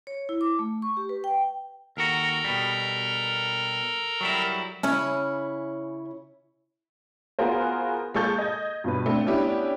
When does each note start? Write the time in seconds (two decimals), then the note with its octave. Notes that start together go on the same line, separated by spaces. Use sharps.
0.07 C#5
0.29 E4
0.41 D6
0.59 A3
0.82 C#6
0.97 G4
1.09 B4
1.24 G5
1.97 D#2 F#4 A4 A#4 A#5
2.44 B2 G3
4.21 F#3 G3 E4
4.83 C#3 C#4 E4 C#5
7.39 B3 F4 F#4 G#4 A#4 C5
8.14 G#3 A#3 A4 C#6 G6 A6
8.38 D#5 G#6
8.84 G2 B2 B4
9.06 A3 C4 D4
9.25 B3 C#4 D4 E4 G4